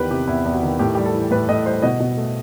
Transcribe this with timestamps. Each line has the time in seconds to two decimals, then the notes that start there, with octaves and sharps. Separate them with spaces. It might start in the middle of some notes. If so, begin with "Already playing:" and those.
Already playing: E2 D#3 G4 B4
0.11 C3 G4
0.27 E2 E4
0.45 E2
0.53 F#4
0.63 D#3
0.79 A2 G4
0.95 G3 G4
1.06 A4
1.15 E3
1.31 A2 B4
1.49 A2 D#5
1.66 G3 C5
1.82 B2 D#5
2.00 B2
2.17 A3